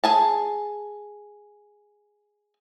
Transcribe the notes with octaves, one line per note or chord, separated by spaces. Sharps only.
G#4 G#5 A5